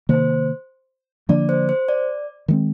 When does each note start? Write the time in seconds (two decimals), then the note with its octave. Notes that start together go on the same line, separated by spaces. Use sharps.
0.09 C3 D#3 A#3 C5
1.29 D3 F3 A#3 D4 D5
1.49 C5
1.69 C5
1.88 D5
2.48 D#3 G#3 C4